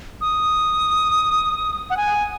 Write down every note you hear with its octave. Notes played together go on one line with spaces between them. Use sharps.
D#6
F#5
G#5